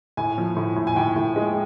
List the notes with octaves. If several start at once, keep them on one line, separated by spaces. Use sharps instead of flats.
A2 G#5
F3
A2
A2
G#5
A2 G5
A2
G#3